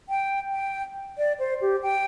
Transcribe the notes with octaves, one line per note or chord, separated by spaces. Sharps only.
G5
G5
D5
C5
G4
G5